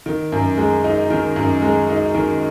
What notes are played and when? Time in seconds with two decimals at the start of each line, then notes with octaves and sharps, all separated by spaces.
0.06 D#3
0.32 F#2
0.58 G#3
0.84 D#4
1.10 D#3
1.36 F#2
1.62 G#3
1.89 D#4
2.15 D#3